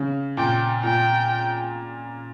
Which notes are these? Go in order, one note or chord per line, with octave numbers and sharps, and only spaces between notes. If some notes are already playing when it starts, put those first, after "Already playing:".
Already playing: C#3
A#2 G5
A#2 G5